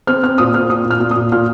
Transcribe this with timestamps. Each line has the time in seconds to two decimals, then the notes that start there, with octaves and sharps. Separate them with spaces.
0.07 C4 F6
0.23 C4 F6
0.38 A#2 D#6
0.54 C4 F6
0.70 A#2 D#6
0.85 A#2
0.91 F6
1.00 A#2
1.11 A#2 D#6
1.32 A#2 F6